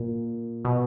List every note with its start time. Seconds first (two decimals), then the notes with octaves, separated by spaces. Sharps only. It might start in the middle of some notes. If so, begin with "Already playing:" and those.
Already playing: A#2
0.65 B2